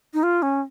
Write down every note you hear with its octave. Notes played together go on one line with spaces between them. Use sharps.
D#4
F4
C#4